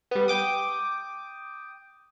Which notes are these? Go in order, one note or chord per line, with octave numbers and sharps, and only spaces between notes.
G3 B3
G5 D6 D#6